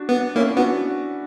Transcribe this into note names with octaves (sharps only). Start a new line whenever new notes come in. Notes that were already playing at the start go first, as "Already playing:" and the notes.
Already playing: D4 F#4
B3
A#3 C#4 E4
B3 D4 F#4